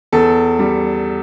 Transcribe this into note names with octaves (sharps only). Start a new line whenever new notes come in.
E2 A4
G3